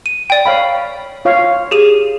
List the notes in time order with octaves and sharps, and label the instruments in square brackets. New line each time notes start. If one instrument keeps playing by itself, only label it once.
[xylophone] D#7
D5 G5
[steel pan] C#5 F5 B5
F4 C#5 F5
[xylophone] G4 G#4 D#7